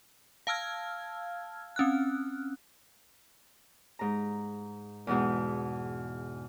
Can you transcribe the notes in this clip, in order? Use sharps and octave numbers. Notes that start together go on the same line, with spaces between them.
F5 A5 E6 F6 G#6
C4 C#4 F6 F#6
G#2 A#5
E2 G#2 B2